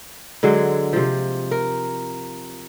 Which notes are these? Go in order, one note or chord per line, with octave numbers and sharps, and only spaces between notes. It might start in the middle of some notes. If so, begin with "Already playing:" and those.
D3 F#3 G#3
C3 F3
A#4